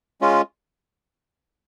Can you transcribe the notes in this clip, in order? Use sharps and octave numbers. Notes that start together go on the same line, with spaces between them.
G#3 C#4 F4